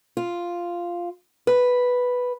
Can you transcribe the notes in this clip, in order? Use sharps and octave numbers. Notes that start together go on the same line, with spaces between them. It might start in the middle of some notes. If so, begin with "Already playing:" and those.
F4
B4